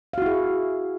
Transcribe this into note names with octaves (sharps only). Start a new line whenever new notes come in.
E4 F#4 G#4 F5